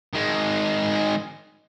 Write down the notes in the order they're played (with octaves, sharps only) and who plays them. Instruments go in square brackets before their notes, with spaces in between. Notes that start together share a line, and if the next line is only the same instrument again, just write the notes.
[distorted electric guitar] D#3 G#3